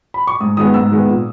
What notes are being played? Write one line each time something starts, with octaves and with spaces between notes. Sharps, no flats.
B5
C#6
G#2 D#6
D#3 G#3 B3 D#6
G#2 E6
D#3 G#3 B3
A#2